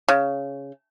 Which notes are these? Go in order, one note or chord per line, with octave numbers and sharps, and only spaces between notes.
C#3